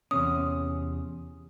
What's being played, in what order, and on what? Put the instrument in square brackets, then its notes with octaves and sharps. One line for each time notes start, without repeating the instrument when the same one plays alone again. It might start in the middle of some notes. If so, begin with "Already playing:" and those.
[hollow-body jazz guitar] E2 C3 C#4 [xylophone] D#6